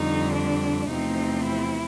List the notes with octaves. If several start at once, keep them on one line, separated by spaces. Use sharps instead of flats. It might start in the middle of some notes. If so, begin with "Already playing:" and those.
Already playing: F2 D3 G3 D#4
D4
E2 C3 F3 A3 C4 D#4
E4